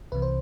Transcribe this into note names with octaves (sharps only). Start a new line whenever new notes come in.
C2 C3 E3 B4
C5